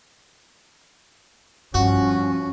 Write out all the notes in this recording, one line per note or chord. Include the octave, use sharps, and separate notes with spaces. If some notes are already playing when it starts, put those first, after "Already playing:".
G2 F3 C#4 F#4